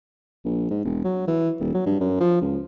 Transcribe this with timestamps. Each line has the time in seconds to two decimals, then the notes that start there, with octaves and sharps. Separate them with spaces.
0.45 A#1
0.70 G#2
0.85 E1
1.04 F#3
1.27 E3
1.60 D#1
1.74 F#3
1.86 G2
2.00 F#2
2.20 F3
2.41 C#2